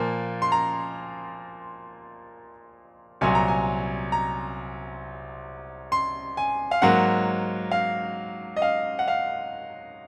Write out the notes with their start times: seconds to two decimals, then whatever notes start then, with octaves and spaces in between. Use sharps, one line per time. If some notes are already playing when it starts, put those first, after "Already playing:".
Already playing: A#2 F3 A#3
0.42 C6
0.52 A#5
3.21 C2 A#2 F#3 G#5
3.35 A#5
3.48 G#5
4.12 A#5
5.92 C6
6.37 G#5
6.71 F5
6.82 G#2 F#3 A#3 F#5
7.71 F5
8.56 D#5
8.62 F5
8.99 F#5
9.08 F5